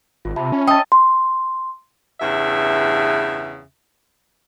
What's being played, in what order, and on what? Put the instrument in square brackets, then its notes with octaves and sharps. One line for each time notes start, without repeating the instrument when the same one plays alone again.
[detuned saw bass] G#1 [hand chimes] F4
[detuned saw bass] C3 [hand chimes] E5 A5 B5
[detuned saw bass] C#4
[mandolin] D#5 [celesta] G5 A5 [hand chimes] D#6 E6 A6
[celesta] C6
[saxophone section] E2 G2 C#3 E5